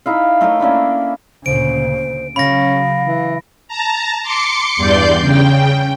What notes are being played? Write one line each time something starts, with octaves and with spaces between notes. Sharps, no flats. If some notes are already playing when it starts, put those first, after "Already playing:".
D#4 E4 F5
A3 A#4 C#5 D#5
A#3 C#4 D4 E4
D2 A#2 C#3 C5 D7
C#3 F#3 C#4 F5 B5 A#6
E3
A5 A#5
C6 D6 C#7
E2 G2 D5 C6 G6
C#3 G5